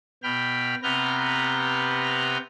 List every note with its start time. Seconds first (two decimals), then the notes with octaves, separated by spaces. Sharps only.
0.23 B2 G5 B5 F6
0.83 C3 B3 B4 A#5 F6 G6